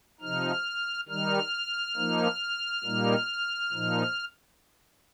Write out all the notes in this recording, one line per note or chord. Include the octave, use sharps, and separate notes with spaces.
C3 F3 D#4 F6
D#3 G3 D#4 F6
F3 A#3 D#4
A#2 G3 A#3 D#4
A#2 F3 D#4